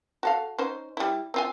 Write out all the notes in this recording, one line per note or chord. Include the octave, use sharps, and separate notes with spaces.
F#4 A4 F5
C#4 D#4 C5
G3 E4
C4 F4 G#5